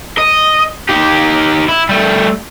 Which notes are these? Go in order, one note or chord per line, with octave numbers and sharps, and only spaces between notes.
D#5
D#4 G4
E4
G3 A3